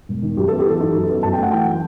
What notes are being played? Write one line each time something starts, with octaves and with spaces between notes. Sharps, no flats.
E1
D#3
F#2 G4
A4
B3
G4
E3 A4
D#4
F#2
B3
F#2 A5
A3 G5
F#5
E3 G5